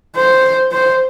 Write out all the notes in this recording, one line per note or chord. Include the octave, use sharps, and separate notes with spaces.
C5
C5